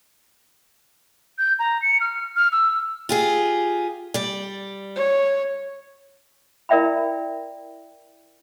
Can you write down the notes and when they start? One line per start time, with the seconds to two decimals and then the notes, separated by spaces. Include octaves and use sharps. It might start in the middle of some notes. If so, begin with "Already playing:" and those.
1.38 G6
1.59 A#5
1.82 C#7
2.01 F6
2.36 F6
2.52 E6
3.09 F4 G4 G#4
4.14 G3 D5
4.96 C#5
6.69 E4 A#4 D5 E5 G5 B5